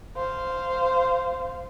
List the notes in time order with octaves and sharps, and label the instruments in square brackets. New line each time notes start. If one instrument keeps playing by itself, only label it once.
[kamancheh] C5 F5